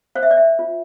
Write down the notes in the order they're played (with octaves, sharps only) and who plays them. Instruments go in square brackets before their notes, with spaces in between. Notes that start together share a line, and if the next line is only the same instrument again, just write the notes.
[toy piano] C5 F5
E5
D5
E5
F4